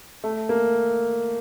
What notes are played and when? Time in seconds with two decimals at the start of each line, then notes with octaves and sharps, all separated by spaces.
0.24 A3
0.49 A#3